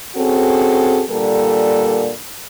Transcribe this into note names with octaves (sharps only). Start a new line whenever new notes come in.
C4 C#4 F#4 G#4 A4
A#2 D3 G3 A4 A#4